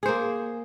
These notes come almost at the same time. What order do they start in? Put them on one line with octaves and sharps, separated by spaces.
G#4 C5 A#3